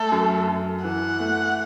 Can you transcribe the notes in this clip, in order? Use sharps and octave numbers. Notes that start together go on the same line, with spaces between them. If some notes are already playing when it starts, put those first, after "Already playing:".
Already playing: A3 A4
F#2
F#2
E3 F#5
A3